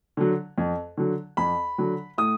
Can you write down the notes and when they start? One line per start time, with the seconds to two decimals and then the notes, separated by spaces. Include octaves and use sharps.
0.17 D3 F#3
0.58 F2
0.97 D3 F#3
1.37 F2 B5
1.78 D3 F#3
2.18 A2 D#6